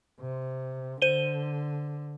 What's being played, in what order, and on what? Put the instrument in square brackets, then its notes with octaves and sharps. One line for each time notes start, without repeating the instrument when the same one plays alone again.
[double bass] C3
[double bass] D3 [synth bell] C5 D#7 G7